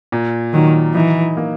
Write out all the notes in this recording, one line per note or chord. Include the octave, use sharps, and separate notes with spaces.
A#2
D#3 F#3
E3 D#4
A#3